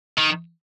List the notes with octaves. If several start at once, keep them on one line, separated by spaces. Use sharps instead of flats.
D#3